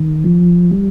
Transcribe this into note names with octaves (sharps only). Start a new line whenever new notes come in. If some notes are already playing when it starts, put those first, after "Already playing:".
Already playing: D#3
F3
G3